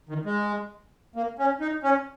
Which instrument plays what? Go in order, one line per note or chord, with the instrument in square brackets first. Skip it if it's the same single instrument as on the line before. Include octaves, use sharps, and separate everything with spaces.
[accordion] D#3
G#3
A#3
C#4
D#4
C#4